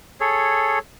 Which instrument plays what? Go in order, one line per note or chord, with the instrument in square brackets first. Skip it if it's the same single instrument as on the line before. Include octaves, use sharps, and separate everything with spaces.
[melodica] G#4 A4 C#5